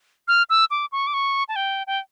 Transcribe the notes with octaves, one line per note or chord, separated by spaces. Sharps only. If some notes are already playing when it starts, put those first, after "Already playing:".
F6
E6
D6
C#6
D6
C#6
A5
G5
G5